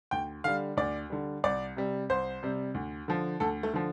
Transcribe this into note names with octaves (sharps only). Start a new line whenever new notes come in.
D2 G5
D3 G3 F5
D2 D5
D3 G3
C2 D5
C3 G3
C2 C5
C3 G3
D2
D3 F3
D2 A4
A3
D3 F3